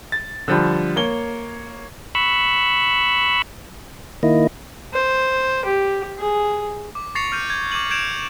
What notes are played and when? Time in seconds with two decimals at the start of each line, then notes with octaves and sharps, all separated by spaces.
0.12 A6
0.48 D3 F3 G3
0.96 A#3 C#5 G7
2.15 B5 C#6 E6 F#6
4.23 D#3 A#3 E4 D#5
4.94 C5
5.65 G4
6.19 G#4
6.95 D6
7.15 C#6 A6 A#6 C7 C#7 F7
7.32 F6 G6 D#7
7.50 G#6
7.72 D6 G#6 D#7 F#7
7.91 G6 G#6 D7 E7 F7